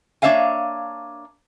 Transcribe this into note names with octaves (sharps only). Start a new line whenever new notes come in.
A#3 D4 C#5 E5 F5 G#5